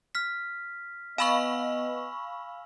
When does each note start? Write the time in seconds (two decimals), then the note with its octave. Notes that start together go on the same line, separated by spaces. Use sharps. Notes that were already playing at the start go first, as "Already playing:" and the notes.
0.15 F6 B6
1.18 B3 D#5 F5 G#5 B5 C#6 E6 F#7